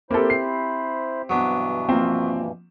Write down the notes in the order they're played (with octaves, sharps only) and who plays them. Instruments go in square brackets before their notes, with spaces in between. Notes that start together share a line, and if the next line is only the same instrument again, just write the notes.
[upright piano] A#3 A4 [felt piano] C4 G4 [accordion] E4 C5 B5
[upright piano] C7
[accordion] G2 B2 E3 [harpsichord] F#3 B3 D4
[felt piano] F3 A#3 [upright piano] C4